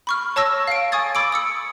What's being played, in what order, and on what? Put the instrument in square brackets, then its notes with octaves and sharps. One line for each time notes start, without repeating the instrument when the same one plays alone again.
[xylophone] B5 C#6 F6
C#5 A5 C#6 E6 A#6
F5 D7
G#5 C#6 D#6 G#6 A6
B5 D6 E6 D7
D#6 E6 C#7